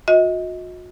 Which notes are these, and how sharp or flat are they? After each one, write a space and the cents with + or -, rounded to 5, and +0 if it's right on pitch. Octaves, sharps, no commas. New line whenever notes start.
F#4 -40 D#5 +30